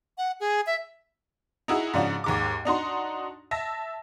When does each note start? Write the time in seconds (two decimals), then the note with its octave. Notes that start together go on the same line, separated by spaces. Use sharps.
0.18 F#5
0.40 G#4
0.66 E5
1.68 D#4 E4 F#4 G#4
1.93 G#2 C#3 F3 D4 F#4
2.24 D#2 G#2 D6
2.65 D4 D#4 F#4 C6
3.51 E5 A5 A#6